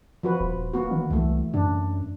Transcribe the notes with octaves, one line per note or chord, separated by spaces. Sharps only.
F3 F#4 B4
D#1
A#3 B3 F#4
D#3
C2 E3 A3
F#2 D4